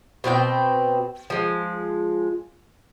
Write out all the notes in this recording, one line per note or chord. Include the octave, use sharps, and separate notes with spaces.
B2 C4 F4 G5
F3 G#3